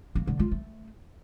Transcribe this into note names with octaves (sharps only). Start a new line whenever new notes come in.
A#3
D3
F4
A3